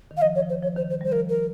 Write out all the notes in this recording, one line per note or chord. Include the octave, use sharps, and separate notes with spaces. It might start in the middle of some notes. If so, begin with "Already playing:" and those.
D#3
F5
F3 D#5
C#5
F3
C5
F3 C#5
D#3 C5
F3 C5
G3 C5
F3 A#4
A#4